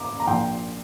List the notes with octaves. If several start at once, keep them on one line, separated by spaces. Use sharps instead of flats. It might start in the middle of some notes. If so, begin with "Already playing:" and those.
Already playing: A#5 D6
A#5
A#1 A#2 A#3 G5 C6